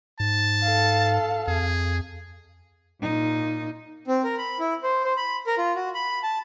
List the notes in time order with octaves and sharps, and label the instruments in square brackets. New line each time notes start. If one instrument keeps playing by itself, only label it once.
[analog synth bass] G#2 [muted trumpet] A5
[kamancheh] A4 F5
[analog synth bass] F2 [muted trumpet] G#4
[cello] A#2 D#4
[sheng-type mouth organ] C4
A#4
B5
E4
C5
C5
B5
A#4
F4
F#4
B5
A5